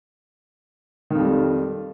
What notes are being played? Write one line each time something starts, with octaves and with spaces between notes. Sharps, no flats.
F2 D#3 G3